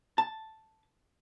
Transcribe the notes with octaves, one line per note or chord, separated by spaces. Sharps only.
A5